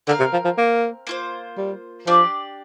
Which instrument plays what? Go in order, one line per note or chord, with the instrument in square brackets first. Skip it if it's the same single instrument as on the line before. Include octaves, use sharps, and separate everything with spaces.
[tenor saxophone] D3 [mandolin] C4 A#4 F5
[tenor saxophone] C3
F3
F3
A#3
[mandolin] A#3 F4 C5
[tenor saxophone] G3
[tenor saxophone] F3 [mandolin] D4 G4 D5